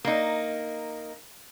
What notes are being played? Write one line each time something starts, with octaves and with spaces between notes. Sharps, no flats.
A#3 D#4